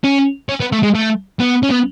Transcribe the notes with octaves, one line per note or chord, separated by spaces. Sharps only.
C#4
C#4
B3
A3
G#3
A3
B3
C#4
B3